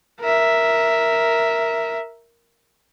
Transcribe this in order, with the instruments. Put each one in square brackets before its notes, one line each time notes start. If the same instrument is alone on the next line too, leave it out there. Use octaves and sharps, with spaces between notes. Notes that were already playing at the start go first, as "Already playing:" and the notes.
[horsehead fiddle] A#4 E5